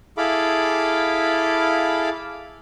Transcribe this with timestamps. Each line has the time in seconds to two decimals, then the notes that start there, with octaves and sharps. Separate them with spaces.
0.17 E4 G#4 A4 F5 B5 D6